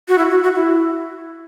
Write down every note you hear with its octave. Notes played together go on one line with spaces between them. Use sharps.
F#4
E4
F#4
F#4
E4